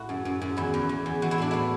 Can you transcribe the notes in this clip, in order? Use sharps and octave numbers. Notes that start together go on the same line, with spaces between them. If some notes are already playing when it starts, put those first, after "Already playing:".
Already playing: A2 E4 F#4
F#2
F#2
F#2
E2 E4
E2
E2
E2
E3 F#4
E4
A2 D4
A2 E4